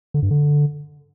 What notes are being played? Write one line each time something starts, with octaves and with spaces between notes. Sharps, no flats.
D3
G2
D3